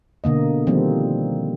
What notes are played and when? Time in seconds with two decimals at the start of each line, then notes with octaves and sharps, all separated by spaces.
0.24 B2 D3 A#3 D#5
0.67 D#3 F3 G3 A#3 C4